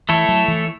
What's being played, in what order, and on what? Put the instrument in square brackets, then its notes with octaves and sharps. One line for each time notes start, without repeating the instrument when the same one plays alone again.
[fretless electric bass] E3 [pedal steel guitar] A3 E4 A4 C#5
[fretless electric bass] F#3
E3